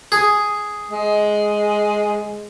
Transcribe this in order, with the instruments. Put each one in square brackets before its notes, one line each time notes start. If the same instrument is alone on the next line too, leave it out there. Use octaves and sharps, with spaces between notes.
[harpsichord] G#4
[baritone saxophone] G#3